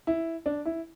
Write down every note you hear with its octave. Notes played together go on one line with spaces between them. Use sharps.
E4
D4
E4